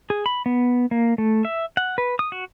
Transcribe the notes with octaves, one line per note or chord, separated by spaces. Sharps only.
G#4
B5
B3
A#3
A3
E5
F#5
B4
D#6
F#4